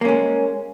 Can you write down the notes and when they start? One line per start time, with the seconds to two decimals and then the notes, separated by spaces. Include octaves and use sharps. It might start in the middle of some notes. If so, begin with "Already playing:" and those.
0.01 A#3
0.05 C#4
0.08 G#3